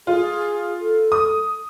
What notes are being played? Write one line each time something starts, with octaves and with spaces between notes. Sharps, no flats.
F4 G#4
A4
D#6